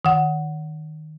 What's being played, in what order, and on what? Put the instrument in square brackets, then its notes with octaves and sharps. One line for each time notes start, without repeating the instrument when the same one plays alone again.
[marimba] D#3 F#5